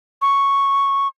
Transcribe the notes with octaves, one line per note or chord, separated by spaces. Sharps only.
C#6